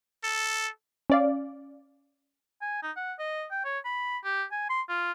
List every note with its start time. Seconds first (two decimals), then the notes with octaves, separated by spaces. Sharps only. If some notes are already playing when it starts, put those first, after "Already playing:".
0.24 A4
1.10 C#4 D5 F5
2.61 G#5
2.83 D#4
2.96 F#5
3.19 D#5
3.51 G5
3.65 C#5
3.85 B5
4.24 G4
4.52 G#5
4.70 C6
4.89 F4